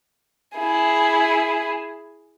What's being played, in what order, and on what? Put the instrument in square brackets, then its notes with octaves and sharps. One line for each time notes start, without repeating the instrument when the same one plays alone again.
[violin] E4 G#4